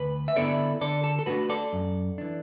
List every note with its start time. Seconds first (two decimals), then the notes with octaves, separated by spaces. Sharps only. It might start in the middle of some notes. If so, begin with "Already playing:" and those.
Already playing: D2 B4
0.28 E5
0.36 D3 B3 E4 A4 D5
0.81 D3 A4 D5
1.04 A4
1.19 A4
1.26 A3 D4 F#4 B4
1.49 A4 D5
1.73 F#2
2.18 E3 D4